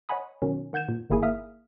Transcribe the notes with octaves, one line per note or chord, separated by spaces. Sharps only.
C#5 D#5 F#5 G#5 B5 D#6
B2 D#3 F#3 C#4
D#3 F#5 G6 G#6 E7
A#2
G1 D#3 A#3 E4 G#4 G#5
A#3 E5 D#6 F6